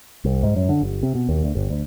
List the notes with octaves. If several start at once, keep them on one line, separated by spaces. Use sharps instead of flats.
C2
G#2
F#2
D3
G1
C3
B2
D#2
D2
G1
D2